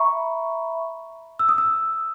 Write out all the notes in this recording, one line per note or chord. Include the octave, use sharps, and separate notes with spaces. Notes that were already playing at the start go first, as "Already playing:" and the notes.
Already playing: E5 A#5 B5 C#6
E6
D#6
E6